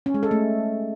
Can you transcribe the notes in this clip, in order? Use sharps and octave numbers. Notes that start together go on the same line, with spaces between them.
C#4
G#3
A4
A3